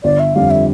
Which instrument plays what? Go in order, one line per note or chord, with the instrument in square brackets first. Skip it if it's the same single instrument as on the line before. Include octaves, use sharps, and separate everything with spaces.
[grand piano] G1 [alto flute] D5
[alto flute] E5
[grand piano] F2 D3 G3 [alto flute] F5
[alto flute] E5